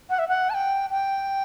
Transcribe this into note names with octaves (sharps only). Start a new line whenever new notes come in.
F#5
E5
F#5
A5
G5
G5